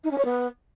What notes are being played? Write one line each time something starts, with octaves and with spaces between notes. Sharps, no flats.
D#4
C#4
C#5
B3